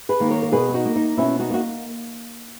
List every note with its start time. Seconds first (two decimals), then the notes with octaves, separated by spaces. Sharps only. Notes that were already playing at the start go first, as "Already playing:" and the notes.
0.09 G#4 B4
0.20 D#3 A#3
0.30 A#4 C#5
0.42 A#4
0.52 B2 G#4 B4
0.69 G#4
0.74 D#4 F#4
0.85 A#3
0.96 D#4
1.17 B2 C#4 E4
1.40 D#4 F#4
1.50 A#3 F#4